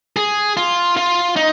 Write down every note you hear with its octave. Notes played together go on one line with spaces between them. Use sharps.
G#4
F4
F4
D#4